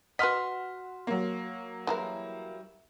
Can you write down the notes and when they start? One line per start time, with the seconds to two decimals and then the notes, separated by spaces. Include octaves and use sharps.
0.19 F#4 B4 D#5 F#5 C6 F6 B6
1.07 F#3 A#3
1.87 E3 G3 G#3 E4 A#4